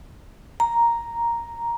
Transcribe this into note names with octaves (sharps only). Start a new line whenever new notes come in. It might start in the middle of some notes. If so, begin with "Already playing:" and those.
A#5